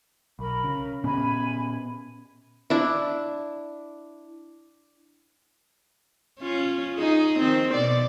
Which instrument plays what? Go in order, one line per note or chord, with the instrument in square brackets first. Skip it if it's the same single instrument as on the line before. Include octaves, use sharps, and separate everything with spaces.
[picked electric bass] B1 [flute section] A#4 B5
[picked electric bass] C#3
[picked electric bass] A#2 B3 C#4 [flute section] G#5 B5
[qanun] D4 E4
[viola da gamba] C#4 F4
D#4 G#4
D#3 C4
B2 D5